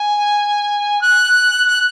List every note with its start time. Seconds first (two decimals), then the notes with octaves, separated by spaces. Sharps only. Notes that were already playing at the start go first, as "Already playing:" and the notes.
Already playing: G#5
1.02 F#6
1.67 F#6